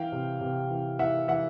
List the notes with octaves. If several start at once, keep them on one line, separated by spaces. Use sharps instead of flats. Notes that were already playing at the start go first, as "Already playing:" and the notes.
Already playing: E3 F5 G5
C3
C3
E3
E3 E5 F#5
E3 E5 F#5